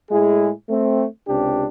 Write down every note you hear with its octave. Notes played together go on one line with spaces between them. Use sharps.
A2 G#3 E4 G#4
A3 C4
C#2 C3 D4 G4